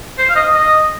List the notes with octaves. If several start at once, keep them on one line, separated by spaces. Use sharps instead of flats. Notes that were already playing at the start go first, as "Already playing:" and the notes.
C5
F5
D#5
D#5